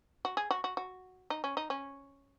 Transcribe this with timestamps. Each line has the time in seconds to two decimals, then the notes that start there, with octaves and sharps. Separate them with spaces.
0.25 F#4
0.37 G#4
0.51 F#4
0.64 F#4
0.77 F#4
1.30 D#4
1.44 C#4
1.57 D#4
1.70 C#4